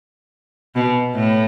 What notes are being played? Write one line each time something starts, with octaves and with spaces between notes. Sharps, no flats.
B2
A2